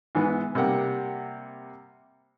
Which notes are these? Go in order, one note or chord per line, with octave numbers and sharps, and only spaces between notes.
G#2 E3 B3
C3 G3 A#3 F#5 G5